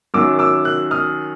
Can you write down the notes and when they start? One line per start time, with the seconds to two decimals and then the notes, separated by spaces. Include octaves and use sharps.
0.14 F#2 D#3 F#3 D6 E6
0.39 D6 E6
0.65 E6 F#6
0.91 D#6 F6